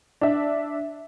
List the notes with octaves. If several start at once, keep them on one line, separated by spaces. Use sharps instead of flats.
D4 E5